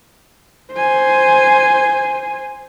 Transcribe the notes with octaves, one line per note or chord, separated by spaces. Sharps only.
C5 G#5